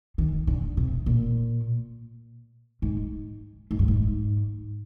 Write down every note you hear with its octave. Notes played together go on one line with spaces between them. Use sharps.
D#3
D3
C3
A#2
G#2
G#2
G2
G#2